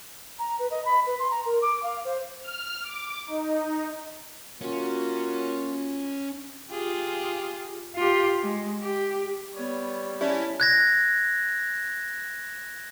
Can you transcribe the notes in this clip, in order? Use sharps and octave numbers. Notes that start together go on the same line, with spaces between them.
A#5
B4
D#5
B5
B4
C6
A#5
A#4
D6
F5
C5
F6
D6
D#4
A#3 C#4 F4 F#4
F4 G4 G#4
F4 G4
G#3
G4
G3 B3 C#5
C#4 E4 G4 C#5 D5 A5
F#6 G#6 A#6